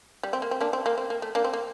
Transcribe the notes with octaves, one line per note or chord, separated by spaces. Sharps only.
G3
C4
A#3
C4
A#3 D4
C4
A#3
C4
A#3
A3
A#3 D4
C4
A#3